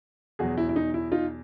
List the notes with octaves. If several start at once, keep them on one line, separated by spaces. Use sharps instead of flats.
E2 B2 F#3 F#4 G#4
E4
E4
D#4
E4
D#4 F4